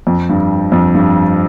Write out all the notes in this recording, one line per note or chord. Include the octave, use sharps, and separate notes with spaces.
F2
G2
F2
G2